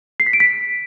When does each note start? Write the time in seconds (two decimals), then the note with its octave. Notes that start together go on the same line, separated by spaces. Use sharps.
0.20 C7
0.27 B6
0.33 D7
0.40 B6